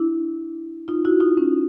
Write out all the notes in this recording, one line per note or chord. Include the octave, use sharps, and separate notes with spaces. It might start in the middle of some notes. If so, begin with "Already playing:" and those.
Already playing: D4 E4
D#4 F4
E4 F#4
D#4 F4
C#4 D#4